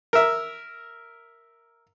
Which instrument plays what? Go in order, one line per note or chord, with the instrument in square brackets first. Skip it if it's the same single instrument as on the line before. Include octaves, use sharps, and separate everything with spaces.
[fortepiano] A#4 E5